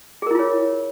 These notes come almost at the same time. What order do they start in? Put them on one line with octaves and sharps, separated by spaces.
G#4 A#4 E4 F4 C#5